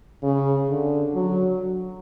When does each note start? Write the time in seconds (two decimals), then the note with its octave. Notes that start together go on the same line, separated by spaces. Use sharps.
0.23 C#3
0.69 D3
1.15 F#3